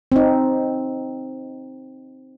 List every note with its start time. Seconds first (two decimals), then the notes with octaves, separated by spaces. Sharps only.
0.12 C4 D#4